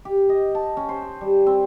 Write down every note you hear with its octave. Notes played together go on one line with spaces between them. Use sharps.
G4
D#5
A5
C#4
C5
G5
G3
C4